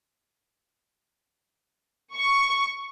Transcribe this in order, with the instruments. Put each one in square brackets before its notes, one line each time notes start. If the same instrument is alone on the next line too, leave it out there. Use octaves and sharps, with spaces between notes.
[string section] C#6